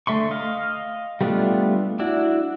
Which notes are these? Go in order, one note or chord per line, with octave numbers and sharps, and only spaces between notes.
D3 A3 E5 C6 C#6
D#5 F5
G3 A3 B3 D4 F4
D4 E4 F#4